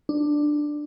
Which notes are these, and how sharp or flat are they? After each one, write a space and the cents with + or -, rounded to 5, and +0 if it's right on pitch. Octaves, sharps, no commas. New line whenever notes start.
D4 +10